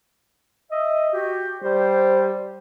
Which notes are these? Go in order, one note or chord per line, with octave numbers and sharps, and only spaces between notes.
D#5 E5
F#4 G4
G3 C5